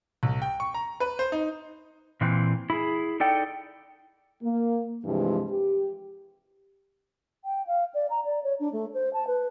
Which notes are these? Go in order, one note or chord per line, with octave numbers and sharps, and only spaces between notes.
C2
G5
C#6
A#5
B4
C5
D#4
A#2 E3 C4
E4 G#4
D#4 A4 D5 G5
A#3
G2 C3 E3 F3 G#3
G4
G5
F5
D5
A#5
D5
C#5
D4
A3
C5
A5
B4